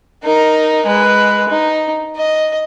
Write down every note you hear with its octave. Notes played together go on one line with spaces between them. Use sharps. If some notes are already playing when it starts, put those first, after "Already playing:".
D#4 A#4
G#3 B4
D#4
D#5